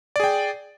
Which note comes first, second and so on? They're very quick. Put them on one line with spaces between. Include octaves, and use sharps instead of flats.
D5 G#4 G5